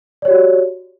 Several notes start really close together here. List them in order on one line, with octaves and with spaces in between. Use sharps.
D5 C#5 G4 F#4